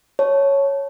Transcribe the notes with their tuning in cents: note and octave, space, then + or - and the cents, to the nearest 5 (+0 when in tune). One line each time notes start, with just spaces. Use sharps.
C#5 +0 A5 -5